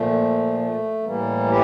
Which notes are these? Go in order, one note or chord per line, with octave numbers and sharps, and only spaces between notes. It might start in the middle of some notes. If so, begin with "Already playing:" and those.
Already playing: A#2 F3 A3
A3
A2 E3 G3 A#3
E4 G4